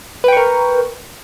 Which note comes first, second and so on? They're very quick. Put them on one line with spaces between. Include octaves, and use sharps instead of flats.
B4 G5 C#6 A#4